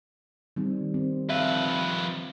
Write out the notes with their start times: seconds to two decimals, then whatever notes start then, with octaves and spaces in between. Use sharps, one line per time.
0.56 D#3 G3 C4
0.94 C4
1.29 F2 B4 E5 F5